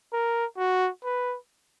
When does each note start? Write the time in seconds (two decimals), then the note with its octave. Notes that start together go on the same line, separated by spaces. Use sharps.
0.13 A#4
0.58 F#4
1.04 B4